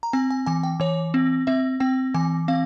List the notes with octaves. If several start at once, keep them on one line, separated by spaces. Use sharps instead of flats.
A#5
C4 G#5
G#5
E3 G#5
G5
E3 C#5
C4
C4 E5
C4 G5
E3 G#5
C4 F5